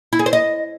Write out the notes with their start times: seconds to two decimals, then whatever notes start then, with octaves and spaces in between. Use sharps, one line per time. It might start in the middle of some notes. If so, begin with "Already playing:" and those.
0.13 E4
0.19 G#4
0.26 C5
0.33 D#5